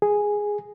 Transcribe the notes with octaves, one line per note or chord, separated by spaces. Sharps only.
G#4